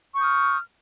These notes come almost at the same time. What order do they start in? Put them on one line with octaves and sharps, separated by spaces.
C#6 G6 D#6 F6